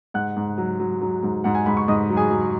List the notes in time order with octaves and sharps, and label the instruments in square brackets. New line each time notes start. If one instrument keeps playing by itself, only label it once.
[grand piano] G#2 F#5 F#6
G#2
F#3
F#3
F#3
G#2
G#2 F#5
G#5
G#2 B5
C#6
G#2 D#5 D#6
F#3
G#4 G#5
F#3